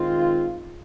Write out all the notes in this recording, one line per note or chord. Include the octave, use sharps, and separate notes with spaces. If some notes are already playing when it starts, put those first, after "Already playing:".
Already playing: D#3 G#3 C4 F4